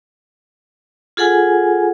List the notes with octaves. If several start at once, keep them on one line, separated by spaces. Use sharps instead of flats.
F4 G#4 A4 F#5 G#5